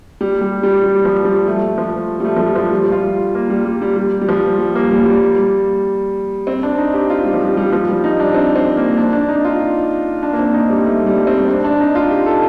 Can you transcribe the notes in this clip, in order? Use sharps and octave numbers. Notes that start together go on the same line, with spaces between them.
G3
G3
G3
G3
F3
G3
A3
F3
G3
A3
F3
G3
F3
G3
F4
A#3
G3
G3
G3
G3
G3
F3
G3
A#3
G3
G3
C4
D4
D#4
G4
F4
G3
F3
G3
G3
F3
G3
D#4
D4
C4
C4
A#3
D4
D4
D#4
F4
D4
A#3
C4
D#4
G3
A3
G3
C4
D4
D4
D#4
F4
G4
A4